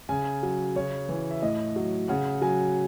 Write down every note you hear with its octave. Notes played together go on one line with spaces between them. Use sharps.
C#3 G#5
F#3
C#3 C#5
E3
E5
A2 D#5
F#3
C#3 F#5
F#3 G#5